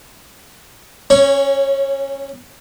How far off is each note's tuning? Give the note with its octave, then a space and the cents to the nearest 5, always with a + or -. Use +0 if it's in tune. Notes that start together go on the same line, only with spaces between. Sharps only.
C#4 -20 C#5 +10